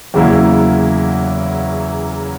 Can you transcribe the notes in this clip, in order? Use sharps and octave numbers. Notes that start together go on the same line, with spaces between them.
E2 C#3 F#3 A#3 E4